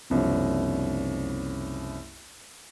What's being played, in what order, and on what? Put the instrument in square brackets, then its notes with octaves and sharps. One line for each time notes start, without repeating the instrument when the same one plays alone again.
[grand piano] F#1 C2 F3 C#4 D4